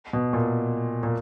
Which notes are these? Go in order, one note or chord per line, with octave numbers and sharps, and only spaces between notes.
B2
A#2
A#2